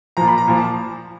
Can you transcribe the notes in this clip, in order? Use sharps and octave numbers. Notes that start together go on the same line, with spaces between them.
A#2 F3 A#5
B5
A#5
A#2 F3
A5